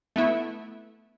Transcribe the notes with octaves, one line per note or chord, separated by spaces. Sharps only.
A3 B3 E4